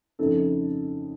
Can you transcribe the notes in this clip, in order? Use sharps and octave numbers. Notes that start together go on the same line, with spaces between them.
F2 C#3 A3 D#4 A4